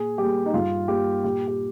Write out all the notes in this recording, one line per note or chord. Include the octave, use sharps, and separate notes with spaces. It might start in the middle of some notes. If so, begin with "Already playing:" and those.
Already playing: A#2 G#4
G3 A#3 G4
D#4
G2 F4
G3 A#3 G4
A#2 G4
G4